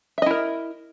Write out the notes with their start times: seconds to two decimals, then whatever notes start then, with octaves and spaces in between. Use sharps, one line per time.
0.18 E5
0.22 D#5
0.26 E4
0.31 A#4